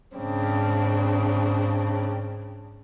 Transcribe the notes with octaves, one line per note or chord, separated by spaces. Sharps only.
G#2 C#3 C4 D4